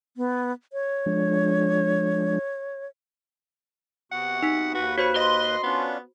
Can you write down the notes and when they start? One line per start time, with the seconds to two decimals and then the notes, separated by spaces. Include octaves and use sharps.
0.17 B3
0.73 C#5
1.06 F3 G#3 D4
4.12 C3 B3 F#4 F#5
4.43 D#4 B6
4.75 D#2 F#4 B4
4.98 F#4 C5 C#5 B5
5.16 D#5 C6
5.64 B3 C#4 D4 F4